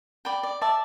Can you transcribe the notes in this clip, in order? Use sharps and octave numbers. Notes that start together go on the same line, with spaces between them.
D5 G5 B5
D5
D5 E5 A5